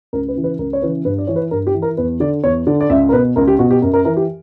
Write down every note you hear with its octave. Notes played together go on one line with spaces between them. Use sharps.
C#2 A#4
B4
C#3 E3
B4
C#2 A#4
C#5
C#3 E3 B4
G2 B4
D5
E3 C#5
B4
G2 A#4
G4
E3
A#4
E2 B4
D3 D5
E2 C#5
D3 D5
D5
C#2 E5
A#4
B2 B4
C#2 A#4
G4
B2 F#4
G4
F#2 A#4
A#4
E3 A#4
G4